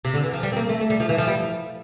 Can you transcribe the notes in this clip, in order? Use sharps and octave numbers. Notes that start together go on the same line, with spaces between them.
C3
D3
E3
F3
G3
C4
A#3
A3
A3
G3
F3
E3
F3
G3